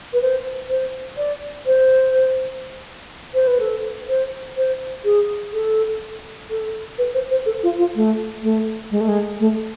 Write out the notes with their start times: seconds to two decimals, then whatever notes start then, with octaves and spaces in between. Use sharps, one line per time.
0.13 B4
0.22 C5
0.70 C5
1.17 D5
1.66 C5
3.34 C5
3.47 B4
3.60 A4
4.09 C5
4.57 C5
5.05 G#4
5.53 A4
6.50 A4
6.98 B4
7.14 C5
7.31 C5
7.46 A4
7.63 F4
7.79 F4
7.96 A3
8.43 A3
8.91 G#3
9.01 A3
9.08 G#3
9.40 A3